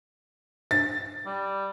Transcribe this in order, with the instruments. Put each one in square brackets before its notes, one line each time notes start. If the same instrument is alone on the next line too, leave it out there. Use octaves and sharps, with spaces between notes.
[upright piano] A6
[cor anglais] G3